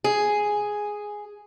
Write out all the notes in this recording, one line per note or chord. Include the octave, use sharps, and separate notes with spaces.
G#4